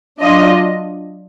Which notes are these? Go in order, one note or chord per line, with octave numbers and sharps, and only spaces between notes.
F#3 D4 F4 D#5